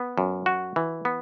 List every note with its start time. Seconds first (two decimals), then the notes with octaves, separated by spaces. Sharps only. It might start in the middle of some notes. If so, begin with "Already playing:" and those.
Already playing: B3
0.18 F#2
0.46 F#4
0.76 E3
1.05 B3